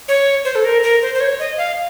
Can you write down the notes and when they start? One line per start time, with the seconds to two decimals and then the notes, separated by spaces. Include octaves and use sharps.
0.08 C#5
0.45 C5
0.55 A4
0.65 A#4
0.83 A#4
1.02 C5
1.15 C5
1.21 C#5
1.39 D#5
1.58 F5